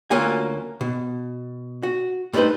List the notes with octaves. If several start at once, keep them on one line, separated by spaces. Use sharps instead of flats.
D2 F#3 A#3 C#4 F4 G#5
B2
F#4
G2 A3 D#4 G4 B4 C5